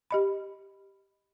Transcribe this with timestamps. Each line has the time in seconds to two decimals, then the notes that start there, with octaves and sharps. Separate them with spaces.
0.11 G4 D#5 B5